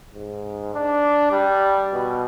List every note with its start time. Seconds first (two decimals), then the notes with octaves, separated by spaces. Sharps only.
0.14 G#2
0.74 D4
1.31 G3
1.93 B2